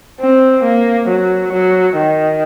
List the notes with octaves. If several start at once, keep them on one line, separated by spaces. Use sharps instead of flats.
C4
A#3
F#3
F#3
D#3